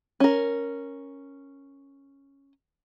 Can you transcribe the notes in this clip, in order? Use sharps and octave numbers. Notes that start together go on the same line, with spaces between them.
C#4 A#4